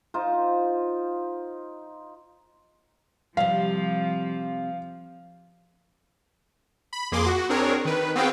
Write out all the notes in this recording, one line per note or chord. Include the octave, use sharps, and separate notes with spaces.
D#4 F4 C5
C3 F3 G3 F5
B5
F2 A#3 G#4 C6 D6
F#4
C4 D4 G#4 A#4 C#5
D#3 B4
B3 C4 F#4 G#4 F5 G5